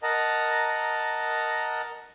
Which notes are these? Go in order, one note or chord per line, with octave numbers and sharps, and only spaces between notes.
A#4 D#5 F#5 A5 A#5